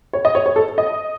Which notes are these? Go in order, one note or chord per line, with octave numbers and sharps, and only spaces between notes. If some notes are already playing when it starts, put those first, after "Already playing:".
C#5
D#5
C#5
C#5
A4
D#5